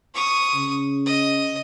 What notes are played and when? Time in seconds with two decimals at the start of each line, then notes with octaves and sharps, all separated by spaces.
0.15 C#6 D#6
0.55 C#3
1.06 D#5